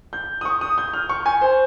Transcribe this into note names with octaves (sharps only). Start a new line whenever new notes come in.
G6
D#6
C#6
D#6
G6
F6
C#6
G#5
C5